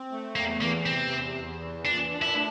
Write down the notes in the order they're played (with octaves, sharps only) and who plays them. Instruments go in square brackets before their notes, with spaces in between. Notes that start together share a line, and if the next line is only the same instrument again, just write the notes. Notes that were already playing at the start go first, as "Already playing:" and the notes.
Already playing: [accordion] C4
A3
[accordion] E2 [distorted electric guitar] A#3
[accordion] E3 [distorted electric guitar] A#3
[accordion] C3 [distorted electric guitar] C4
[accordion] E2
E2
E3
[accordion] A#2 [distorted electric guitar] D4
[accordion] D4
[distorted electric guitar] E4
[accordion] A3